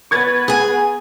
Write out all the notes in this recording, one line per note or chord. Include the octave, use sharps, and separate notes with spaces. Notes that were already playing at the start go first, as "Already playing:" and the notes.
B3 B4 C#6 G#6 A6
G#4 G#5